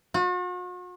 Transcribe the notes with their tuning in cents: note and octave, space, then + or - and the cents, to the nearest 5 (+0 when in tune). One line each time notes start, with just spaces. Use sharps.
F#4 -45